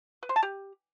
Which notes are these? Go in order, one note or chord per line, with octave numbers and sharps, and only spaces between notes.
B4
C5
A5
G4